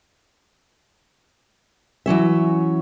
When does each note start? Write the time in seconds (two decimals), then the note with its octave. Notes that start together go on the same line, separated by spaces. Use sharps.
2.06 E3 F#3 C#4 E5